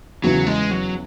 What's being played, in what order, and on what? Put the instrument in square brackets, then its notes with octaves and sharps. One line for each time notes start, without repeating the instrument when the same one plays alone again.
[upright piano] E2 C#3 E3 [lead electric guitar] F#3
[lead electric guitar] G#3
F#3